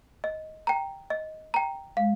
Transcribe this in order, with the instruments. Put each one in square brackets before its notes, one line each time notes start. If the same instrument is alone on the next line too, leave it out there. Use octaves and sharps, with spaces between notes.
[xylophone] D#5
G5 A#5
D#5
G5 A#5
[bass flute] G#3 [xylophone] F5